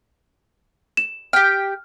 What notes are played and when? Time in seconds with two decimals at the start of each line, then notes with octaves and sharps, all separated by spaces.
0.97 E7
1.33 G4 G5 F6